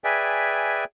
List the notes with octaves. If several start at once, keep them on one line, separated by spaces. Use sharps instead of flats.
G#4 B4 D5 E5 G5 G#5